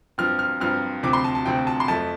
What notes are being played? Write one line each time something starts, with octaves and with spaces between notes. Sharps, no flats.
G2 F3 C4 F6
F6
G2 F3 C4 F6
D2 C3 F3 C4 D6
C6
A5
A5
D2 C3 F3 C4 G5
A5
C6
F2 F3 A3 A5